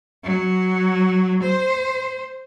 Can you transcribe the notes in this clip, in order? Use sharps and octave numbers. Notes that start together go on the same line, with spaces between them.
F#3
C5